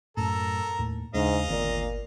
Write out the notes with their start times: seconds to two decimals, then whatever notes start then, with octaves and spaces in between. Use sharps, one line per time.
0.17 F#2 A2 A4 A#4
0.79 D#2 A2
1.14 D#2 G#2 C#3 G#3 D4 D#5 F5
1.49 G1 D2 A#2 D#3 B3